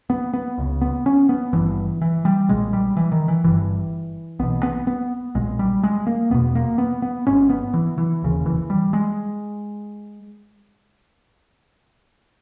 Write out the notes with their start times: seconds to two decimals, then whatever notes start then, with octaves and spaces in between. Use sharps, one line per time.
0.10 B3
0.33 B3
0.58 C#2 C#3
0.81 B3
1.06 C#4
1.29 B3
1.53 G#1 G2 E3
2.01 E3
2.25 G3
2.49 B1 A#2 G#3
2.73 G3
2.97 E3
3.12 D#3
3.28 E3
3.44 G1 G2 E3
4.39 B1 B2 B3
4.63 B3
4.87 B3
5.35 B1 A#2 G#3
5.59 G3
5.83 G#3
6.07 A#3
6.30 E1 E2 B2 B3
6.55 A#3
6.78 B3
7.02 B3
7.27 G#1 G#2 C#4
7.50 B3
7.74 E3
7.98 E3
8.23 E1 D#2 C#3
8.46 E3
8.70 G3
8.93 G#3